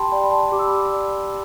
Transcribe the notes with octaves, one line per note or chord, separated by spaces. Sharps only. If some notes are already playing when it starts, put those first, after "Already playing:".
Already playing: G4 G5 A5 B5 C6
D5 G5 B5
B5
A5 C6
G4 D6
E6
B5 D6
D5